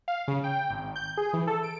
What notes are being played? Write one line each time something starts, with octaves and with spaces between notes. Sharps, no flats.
F5
C#3
G5
G#1
G6
G#4
E3
A4
D7